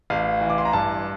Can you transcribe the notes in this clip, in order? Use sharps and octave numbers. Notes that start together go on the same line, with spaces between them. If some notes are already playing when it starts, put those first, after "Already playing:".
A1 F5
E3
D6
C6
A#5
G2 A5